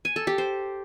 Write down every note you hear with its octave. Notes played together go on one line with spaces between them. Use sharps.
G#5
A4
G4
C5